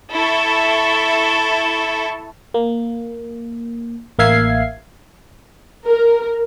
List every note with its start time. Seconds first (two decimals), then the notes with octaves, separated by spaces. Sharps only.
0.12 E4 A4 C#6
2.54 A#3
4.19 A1 A#3 E5 F5 G#6 C7
5.87 A#4